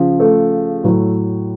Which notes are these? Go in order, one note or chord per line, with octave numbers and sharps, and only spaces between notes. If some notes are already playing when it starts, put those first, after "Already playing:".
Already playing: C#3 F3
A3
A2 F#3